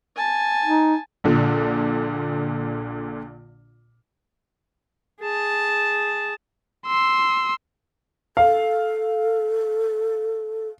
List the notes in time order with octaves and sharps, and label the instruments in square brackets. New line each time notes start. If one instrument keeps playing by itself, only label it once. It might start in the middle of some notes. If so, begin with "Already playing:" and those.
[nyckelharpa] G#5 A5
[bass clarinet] D#4
[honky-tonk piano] A#1 A#2 D3
[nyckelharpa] G#4 A5
[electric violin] C6 E6
[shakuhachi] A4 [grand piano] F5